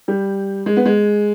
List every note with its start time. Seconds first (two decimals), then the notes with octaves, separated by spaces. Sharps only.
0.08 G3
0.66 G#3
0.77 B3
0.85 G#3